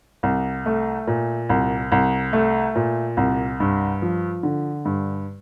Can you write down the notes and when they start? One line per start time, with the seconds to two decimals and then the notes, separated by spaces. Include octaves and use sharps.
0.23 C2
0.66 A3
1.07 A#2
1.49 C2
1.92 C2
2.33 A3
2.75 A#2
3.17 C2
3.60 G2
4.02 F3
4.43 D3
4.85 G2